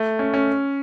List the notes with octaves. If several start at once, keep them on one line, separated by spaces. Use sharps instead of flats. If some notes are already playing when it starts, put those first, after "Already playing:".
Already playing: A3
C#4
C#4